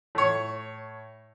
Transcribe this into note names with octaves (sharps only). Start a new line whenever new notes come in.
A2 C#5